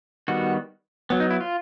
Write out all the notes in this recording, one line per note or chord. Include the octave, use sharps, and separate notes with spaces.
D#3 G3 B3 F#4
F#3 B3
D#4
E4
F4